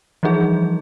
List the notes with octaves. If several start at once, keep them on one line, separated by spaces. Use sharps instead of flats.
E3 F3 G3 D#4 G#4